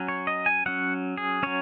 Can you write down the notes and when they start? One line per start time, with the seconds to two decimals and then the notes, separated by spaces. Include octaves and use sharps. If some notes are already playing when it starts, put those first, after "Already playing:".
Already playing: F#3 C#4
0.08 C#5
0.27 D#5
0.46 G#5
0.66 F#3 C#4 F#5
1.17 G#4
1.43 F#3 C#4 C#5